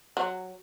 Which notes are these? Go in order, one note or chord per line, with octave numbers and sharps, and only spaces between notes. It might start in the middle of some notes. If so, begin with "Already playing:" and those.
F#3